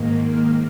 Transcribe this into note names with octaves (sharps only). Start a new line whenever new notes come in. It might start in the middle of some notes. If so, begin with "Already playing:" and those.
Already playing: G#2 D#3 A#3
F6